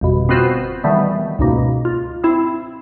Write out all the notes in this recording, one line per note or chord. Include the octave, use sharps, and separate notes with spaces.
G1 F2 B2
B3 C4 F4 F#4 B4 C5
D#3 E3 G3 A3 B3
C#2 G#2 B2 A#3
F4
C4 E4